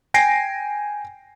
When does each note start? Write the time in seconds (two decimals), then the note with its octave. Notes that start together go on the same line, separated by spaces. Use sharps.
0.14 G5 G#5 A#6 C7 D7